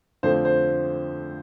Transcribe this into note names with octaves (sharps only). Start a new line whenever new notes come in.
F2 D3 F3 A3 C5
C5